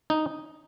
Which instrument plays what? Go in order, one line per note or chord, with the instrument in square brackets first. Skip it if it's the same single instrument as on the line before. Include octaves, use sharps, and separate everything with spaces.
[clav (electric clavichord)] D#4